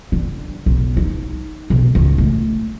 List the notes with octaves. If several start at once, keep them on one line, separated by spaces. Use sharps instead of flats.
D3
B1
D#4
B1
C#2
A3